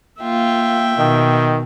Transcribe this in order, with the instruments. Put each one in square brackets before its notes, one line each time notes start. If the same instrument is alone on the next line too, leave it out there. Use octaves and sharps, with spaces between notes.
[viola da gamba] A#3 F4 [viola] E5 G5
[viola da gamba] B2 [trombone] D#3